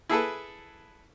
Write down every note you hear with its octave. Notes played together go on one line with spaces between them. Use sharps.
E4 G#4 A4 B4